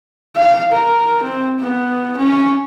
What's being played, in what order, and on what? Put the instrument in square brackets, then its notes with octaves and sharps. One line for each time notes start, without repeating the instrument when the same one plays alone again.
[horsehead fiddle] F5
A#4
C4
B3
C#4